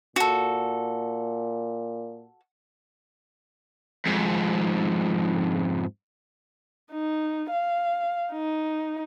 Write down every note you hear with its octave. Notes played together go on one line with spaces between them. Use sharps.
A#2 F#4 A4
F2 G#2
D#4
F5
D#4